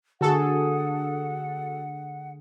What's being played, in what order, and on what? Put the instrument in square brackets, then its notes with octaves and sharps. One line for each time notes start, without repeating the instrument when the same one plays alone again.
[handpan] D3 G#4 [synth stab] F#4 A4 [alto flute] F#5